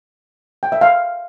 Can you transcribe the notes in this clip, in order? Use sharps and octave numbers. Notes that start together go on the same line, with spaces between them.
G5
E5
F5